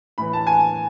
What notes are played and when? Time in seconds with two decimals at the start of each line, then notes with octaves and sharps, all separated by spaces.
0.18 A2 E3 B5
0.33 A5
0.47 G#5